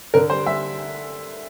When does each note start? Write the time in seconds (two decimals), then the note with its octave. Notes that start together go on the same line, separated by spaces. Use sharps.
0.14 D3 A#4
0.30 G3 C5
0.46 G3 E5